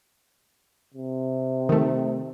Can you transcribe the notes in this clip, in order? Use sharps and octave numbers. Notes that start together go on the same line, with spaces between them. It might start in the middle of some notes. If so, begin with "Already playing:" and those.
C3
D#3 A3